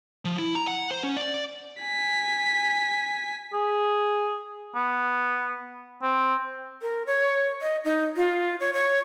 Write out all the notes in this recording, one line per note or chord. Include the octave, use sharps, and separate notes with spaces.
F3
E4
A#5
F#5
C5
C#4
D5
G#5 B6
G#4
B3
C4
A#4
C#5
D#5
D#4
F4
C#5
C#5